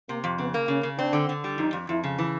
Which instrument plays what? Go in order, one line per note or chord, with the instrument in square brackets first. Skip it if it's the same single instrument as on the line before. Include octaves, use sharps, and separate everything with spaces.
[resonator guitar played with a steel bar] C3 [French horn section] A#3
[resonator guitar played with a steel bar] F2
[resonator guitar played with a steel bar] C#3 [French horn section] B3
[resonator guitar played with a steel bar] A#3
[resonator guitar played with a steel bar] C#3 [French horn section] C#4
[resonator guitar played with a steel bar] C#3
[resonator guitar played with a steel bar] C4 [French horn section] D4
[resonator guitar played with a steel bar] D3
D3
G3
[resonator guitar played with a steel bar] F2 [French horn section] D#4
[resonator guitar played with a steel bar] F2
[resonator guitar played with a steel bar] F2 [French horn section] E4
[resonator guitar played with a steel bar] C#3
E3